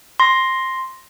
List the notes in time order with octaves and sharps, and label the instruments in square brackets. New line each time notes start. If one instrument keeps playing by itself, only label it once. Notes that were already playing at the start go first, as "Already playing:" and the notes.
[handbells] C6 A#6